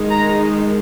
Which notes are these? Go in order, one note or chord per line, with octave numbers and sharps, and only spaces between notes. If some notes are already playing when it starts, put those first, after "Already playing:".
Already playing: D#3 G#3 D#4
A#5